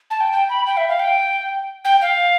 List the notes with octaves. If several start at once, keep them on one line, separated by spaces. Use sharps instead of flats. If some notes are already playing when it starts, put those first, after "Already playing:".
A5
G5
G5
B5
G5
E5
F5
G5
G5
F5